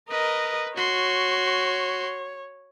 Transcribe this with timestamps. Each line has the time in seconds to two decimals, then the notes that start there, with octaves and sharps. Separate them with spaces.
0.10 A#4 B4 D#5
0.77 F#4 C#5 C6